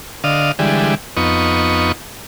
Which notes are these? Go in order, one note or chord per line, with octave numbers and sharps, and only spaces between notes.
D3 D#5 F5
D3 E3 G3 G#3
F2 B3 D#4 C#6